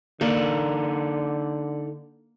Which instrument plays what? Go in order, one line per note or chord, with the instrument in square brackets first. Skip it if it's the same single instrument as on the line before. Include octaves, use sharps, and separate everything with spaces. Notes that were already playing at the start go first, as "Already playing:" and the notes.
[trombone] D3 [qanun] A#3 [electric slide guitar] D#4 A4 D5